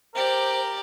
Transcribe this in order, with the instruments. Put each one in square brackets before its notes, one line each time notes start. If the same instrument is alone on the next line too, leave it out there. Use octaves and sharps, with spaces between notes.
[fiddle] G4 D5 [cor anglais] A#4 [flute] C5